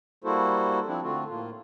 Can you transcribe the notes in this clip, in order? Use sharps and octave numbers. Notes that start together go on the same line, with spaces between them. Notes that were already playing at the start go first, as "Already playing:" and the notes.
G3 A#3 E4 F#4 A4 C5
F3 C4 D4 E4
D3 A3 C4 F4 F#4
A2 A#3 F4